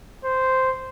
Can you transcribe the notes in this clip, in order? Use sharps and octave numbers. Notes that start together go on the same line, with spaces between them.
C5